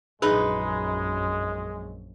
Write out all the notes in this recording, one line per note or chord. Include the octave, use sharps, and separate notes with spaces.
A#1 F#2 G#3 D#4 G#4 B4